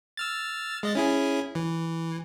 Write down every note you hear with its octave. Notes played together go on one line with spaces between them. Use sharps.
E6 F6 A6
G#3 D#5 A6
C#4 E4 G#4
E3